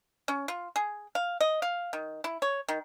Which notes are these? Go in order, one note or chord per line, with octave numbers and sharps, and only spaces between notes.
C#4
F4
G#4
F5
D#5
F5
D#3
E4
C#5
D#3